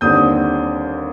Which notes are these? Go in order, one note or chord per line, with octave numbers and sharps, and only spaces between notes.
D#2 D3 G3 C4 D#6 G6